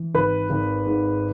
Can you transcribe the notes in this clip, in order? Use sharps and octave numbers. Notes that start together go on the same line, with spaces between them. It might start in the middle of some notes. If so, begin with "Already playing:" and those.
Already playing: E3
G#1 B4 B5
G#1
G#2